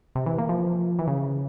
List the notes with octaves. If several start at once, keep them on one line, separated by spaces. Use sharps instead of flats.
C3
E3
A#3
F3
E3
C#3